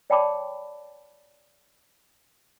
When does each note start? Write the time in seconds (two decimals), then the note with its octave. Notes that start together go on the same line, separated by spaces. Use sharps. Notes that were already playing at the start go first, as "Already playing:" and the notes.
0.10 C#5 D5 G5 A5 B5 D6